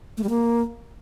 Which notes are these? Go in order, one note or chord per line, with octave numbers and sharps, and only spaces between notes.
A3
G3
A#3